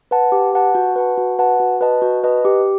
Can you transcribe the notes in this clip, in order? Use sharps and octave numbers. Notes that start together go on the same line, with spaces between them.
B4 F#5 A5
G4
B4 F#5 A5
F#4
B4 F#5 A5
F#4
B4 F#5 A5
F#4
B4 D#5 A5
F#4
B4 D#5 A5
G4